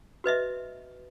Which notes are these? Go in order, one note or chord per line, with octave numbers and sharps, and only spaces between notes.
F#4 B4 D#5 E5